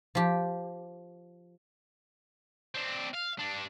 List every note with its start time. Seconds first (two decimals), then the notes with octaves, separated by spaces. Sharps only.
0.15 F3 G4
2.75 C4 D4
3.14 F5
3.39 G2 D4